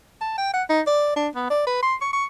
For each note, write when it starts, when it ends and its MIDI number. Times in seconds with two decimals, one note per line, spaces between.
0.21 0.35 81
0.38 0.51 79
0.54 0.63 78
0.69 0.81 63
0.87 1.11 74
1.16 1.28 62
1.35 1.45 59
1.50 1.66 74
1.67 1.78 71
1.83 1.95 84
2.01 2.10 85
2.13 2.25 85